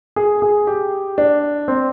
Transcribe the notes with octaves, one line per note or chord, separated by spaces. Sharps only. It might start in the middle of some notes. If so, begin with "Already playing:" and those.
G#4
G#4
G4
D4
C4